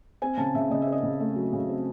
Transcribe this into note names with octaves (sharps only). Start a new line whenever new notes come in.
C4 G#5
C#3 A5
C#3 E5
C#3 D#5
E5
C4
D#5
C#3
A3
F#3
C#3
C4